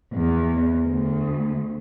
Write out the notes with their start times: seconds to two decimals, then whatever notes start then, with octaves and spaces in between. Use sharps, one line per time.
0.12 E2
0.82 D2